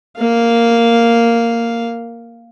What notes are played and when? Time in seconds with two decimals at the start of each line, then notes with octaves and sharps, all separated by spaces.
0.19 A#3 F5